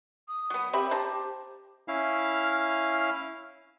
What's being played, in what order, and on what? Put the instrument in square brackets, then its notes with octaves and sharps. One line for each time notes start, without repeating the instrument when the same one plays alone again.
[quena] D#6
[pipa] F#3 B3
[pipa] C4 E5 B5 [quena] G4
[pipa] C5 A5 A#5
[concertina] C#4 E4 F5 F6